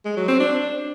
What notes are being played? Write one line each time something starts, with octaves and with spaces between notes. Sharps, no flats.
G#3
F#3
C4
D4